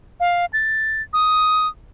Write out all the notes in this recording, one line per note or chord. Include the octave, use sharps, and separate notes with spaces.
F5
A6
D#6